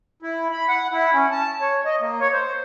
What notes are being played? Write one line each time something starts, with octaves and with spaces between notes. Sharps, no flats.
E4
B5
F#5
E4
C#4
A5
C#5
D#5
A#3
C#5
C5